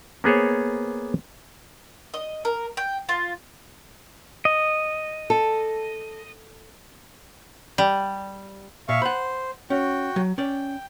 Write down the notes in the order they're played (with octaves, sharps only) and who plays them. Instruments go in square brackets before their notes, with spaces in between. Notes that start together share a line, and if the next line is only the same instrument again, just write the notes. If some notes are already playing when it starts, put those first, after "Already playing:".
[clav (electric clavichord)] A#3 B3 G#4 C5 C#5
[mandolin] D#5
A#4
G5
F4
[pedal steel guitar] D#5
[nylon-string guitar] A4
[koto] G3
[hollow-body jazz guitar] A#2 [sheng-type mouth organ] E5 F5 C#6
[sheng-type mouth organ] C5 [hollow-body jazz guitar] F#5 B5
[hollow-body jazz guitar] C#4 [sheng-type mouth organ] F#4 G5
[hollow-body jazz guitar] F#3
[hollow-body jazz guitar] C#4 D5 [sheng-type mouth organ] G5